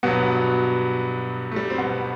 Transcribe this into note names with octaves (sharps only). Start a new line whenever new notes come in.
G2 B2 F#3 B3
A3
G3
C4
B2 B3